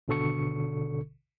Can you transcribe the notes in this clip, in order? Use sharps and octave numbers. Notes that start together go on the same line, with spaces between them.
G#1 B2 D3 A4 C#6 C#7